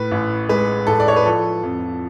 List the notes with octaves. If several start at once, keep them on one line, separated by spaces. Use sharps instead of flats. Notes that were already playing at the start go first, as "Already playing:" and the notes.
Already playing: A2 B4
A1
G#3 B4
A1 A4
D5
C#5
B4
F3 A4
F2